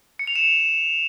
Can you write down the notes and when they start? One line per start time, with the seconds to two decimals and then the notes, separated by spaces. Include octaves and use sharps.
0.19 C#7
0.27 F7
0.36 E7